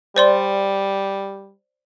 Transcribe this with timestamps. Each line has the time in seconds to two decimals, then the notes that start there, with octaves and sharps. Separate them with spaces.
0.16 G3 C5 D5 C6